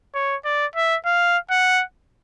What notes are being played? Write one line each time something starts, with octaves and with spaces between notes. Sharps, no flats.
C#5
D5
E5
F5
F#5